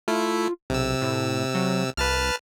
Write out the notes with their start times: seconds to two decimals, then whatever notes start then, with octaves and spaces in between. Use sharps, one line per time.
0.08 A3 E4 F4
0.70 B1 C3 E6
1.02 A2
1.55 F#3
1.97 C2 B4 A5 F6